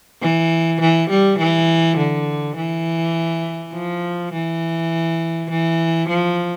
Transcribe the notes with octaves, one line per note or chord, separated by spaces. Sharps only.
E3
E3
G3
E3
D3
E3
F3
E3
E3
F3